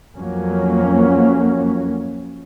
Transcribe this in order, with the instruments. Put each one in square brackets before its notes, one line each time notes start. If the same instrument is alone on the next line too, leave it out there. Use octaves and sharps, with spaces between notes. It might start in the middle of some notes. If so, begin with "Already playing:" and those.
[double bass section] F2 F#3 A#3 C#4